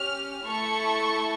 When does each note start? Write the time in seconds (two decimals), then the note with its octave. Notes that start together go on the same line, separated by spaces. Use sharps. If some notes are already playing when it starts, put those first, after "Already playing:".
Already playing: C#4 G4 F6
0.46 A3 E4 A4 C#6